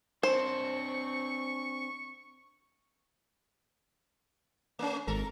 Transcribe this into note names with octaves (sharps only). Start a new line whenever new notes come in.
C4 D4 C5 C#6
A3 C#4
G#1 A4 A#4